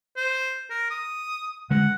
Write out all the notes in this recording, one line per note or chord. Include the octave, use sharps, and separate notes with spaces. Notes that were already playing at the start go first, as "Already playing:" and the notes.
C5
A#4
D#6
D3 G#3 F#5